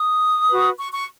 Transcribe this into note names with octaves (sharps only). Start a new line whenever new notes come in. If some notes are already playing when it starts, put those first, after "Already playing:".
Already playing: D#6
F#4 B4
C#6
C#6